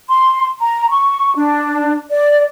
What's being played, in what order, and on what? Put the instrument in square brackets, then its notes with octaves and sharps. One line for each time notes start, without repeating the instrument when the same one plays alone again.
[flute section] C6
A#5
C#6
D4
D5